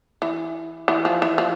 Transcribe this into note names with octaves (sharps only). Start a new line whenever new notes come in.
E3
E3
F3
E3
F3